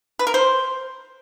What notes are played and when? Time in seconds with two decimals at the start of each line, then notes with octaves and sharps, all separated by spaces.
0.19 B4
0.27 A#4
0.34 C5